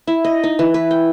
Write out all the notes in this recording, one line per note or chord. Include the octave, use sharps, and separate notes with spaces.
E4
D#5
D#4
E3
B4
G5